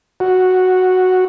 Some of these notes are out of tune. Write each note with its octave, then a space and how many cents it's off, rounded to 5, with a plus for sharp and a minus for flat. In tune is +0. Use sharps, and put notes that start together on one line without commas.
F#4 +0